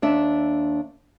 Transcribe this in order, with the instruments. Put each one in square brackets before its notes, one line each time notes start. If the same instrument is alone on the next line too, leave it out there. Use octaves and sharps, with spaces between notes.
[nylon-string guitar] D#2 D4 E5